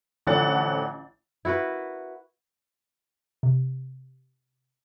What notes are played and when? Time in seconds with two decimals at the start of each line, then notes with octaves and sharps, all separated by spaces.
0.27 A1 D3 F3 C#5 F#5 A6
1.45 E4 F#4 A#4 B4
3.43 C3